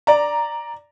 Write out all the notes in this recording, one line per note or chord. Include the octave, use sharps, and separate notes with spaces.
D5 A#5